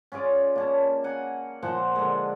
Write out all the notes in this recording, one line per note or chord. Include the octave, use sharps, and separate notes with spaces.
C#4 F4 G#4 D5
A#3 C#4 A5
F#5 G#5 A#5
A#2 F3 C5 F#5
D3 G#3